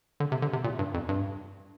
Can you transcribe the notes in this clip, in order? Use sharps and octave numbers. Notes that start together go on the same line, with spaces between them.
D3
C3
D3
C3
A#2
G2
F2
G2